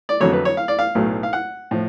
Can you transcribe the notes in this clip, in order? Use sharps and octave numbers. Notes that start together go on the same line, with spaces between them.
D5
F2 D3 F#3 A3 C#5
B4
C#5
F5
D5
F5
B1 A2 F#3 A3
F5
F#5
A2 F3